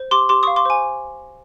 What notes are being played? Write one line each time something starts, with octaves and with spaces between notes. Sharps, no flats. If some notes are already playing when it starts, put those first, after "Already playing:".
Already playing: C5
G4 C6 D6
G4 C6 D6
F5 C#6 D#6
C6 D6
C5 G#5